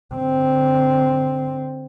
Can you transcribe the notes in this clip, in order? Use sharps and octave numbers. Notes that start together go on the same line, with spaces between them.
D3 C4